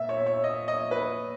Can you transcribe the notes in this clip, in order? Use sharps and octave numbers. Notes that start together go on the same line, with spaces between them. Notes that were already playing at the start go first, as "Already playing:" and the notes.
Already playing: A#2 E5
C#5
C#5
D#5
D#5
B4